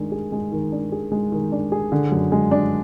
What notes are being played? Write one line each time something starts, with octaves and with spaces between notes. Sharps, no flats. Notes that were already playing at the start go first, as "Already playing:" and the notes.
Already playing: D#3 G#3 D4
G#4
G#3
D#3
D4
G#4
G#3
D#3
D4
G#4
D3
F#2
G#3
D4